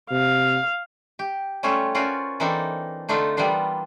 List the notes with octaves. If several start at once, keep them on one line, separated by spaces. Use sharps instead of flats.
C3 F5
G4
G3 A3 C#4 F4 C#5 E5
C#4 F4 F#4 A#4 C5 D5
E3 A#3 C4 D4 D#4 A4
D3 A3 D4 D#4 F4
E3 G3 A#3 B3 D4 F4